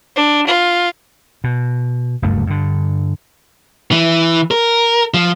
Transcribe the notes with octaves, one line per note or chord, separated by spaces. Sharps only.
D4
F4
B2
F#1 D2 G2 A3
G2 D3
E3
A#4
F3